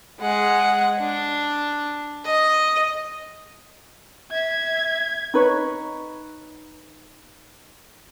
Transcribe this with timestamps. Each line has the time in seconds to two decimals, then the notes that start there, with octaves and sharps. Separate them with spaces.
0.20 G#3 F#5
0.99 D4
2.25 D#5
4.31 E5 G#6
5.34 D#4 B4 C#5